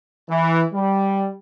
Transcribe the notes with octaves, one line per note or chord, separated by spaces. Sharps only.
E3
G3